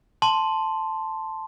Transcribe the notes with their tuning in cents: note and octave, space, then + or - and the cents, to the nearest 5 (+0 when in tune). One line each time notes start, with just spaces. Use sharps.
A5 +0 C6 +0